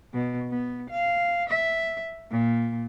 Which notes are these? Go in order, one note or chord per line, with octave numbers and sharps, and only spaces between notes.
B2
B3
F5
E5
A#2